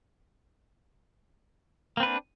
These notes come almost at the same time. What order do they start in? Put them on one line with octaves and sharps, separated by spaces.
A#3 C4 B4 D4